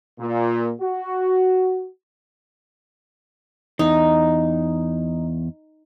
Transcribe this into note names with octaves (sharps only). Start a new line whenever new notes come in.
A#2
F#4
E2 D#4